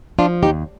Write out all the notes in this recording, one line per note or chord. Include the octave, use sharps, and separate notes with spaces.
F3 D4 F4
D#2 D#4 G4